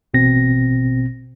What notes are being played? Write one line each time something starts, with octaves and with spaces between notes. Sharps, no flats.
A1 B2 C4 A#6